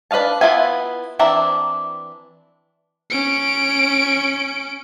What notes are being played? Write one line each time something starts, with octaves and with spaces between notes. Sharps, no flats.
D4 B4 D#5 F5 A5
B3 E4 F4 E5 G#5
E3 C4 D4 E5 A#5
C#4 D7